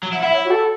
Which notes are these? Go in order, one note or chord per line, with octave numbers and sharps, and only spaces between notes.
F#3
E4 F#5
E4 E5
C#5
F#4
A4